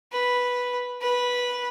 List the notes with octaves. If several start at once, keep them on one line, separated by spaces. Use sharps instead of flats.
B4
B4